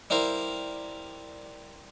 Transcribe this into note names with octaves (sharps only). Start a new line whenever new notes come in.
G3 E4 A#4 C5 F5